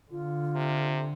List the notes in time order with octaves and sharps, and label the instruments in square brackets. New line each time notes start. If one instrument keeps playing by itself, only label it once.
[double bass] D3 [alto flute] F4
[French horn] C3